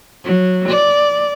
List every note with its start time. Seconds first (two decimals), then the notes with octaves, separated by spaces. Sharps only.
0.24 F#3
0.69 D5